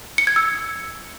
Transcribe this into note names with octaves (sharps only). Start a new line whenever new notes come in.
C#7
G#6
E6